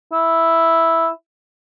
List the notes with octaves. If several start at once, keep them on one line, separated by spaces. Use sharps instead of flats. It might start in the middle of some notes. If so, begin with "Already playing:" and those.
E4